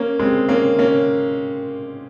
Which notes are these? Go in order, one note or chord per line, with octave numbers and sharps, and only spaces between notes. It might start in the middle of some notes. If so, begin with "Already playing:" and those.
Already playing: A#3 C#4
G#3 C4
A#3 C#4
A#3 C#4